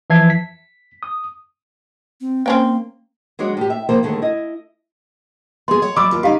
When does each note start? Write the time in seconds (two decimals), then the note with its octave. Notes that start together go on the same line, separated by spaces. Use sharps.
0.10 E3 F3 E5 A5 G#6 C7
0.30 B6
1.03 D#6
2.21 C4
2.46 A#3 C4 C#4 G5
3.39 F#3 G#3 D4 F#4 C#5
3.57 A2 G4
3.70 E5
3.89 C3 F3 A#3 A4 A#4 C5
4.03 D#2 G#2 D3 D#3 A3 G#4
4.22 E4 D#5
5.68 B3 G#4 C6
5.82 C#5 F#5
5.96 F#3 D5 B5 D6 E6
6.11 D#2 F4
6.23 C#3 D#4 G4 F5